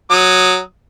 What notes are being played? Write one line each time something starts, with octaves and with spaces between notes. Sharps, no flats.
F#3 D#6